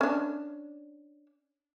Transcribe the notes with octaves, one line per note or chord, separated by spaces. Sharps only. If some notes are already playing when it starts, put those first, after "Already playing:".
C#4 D4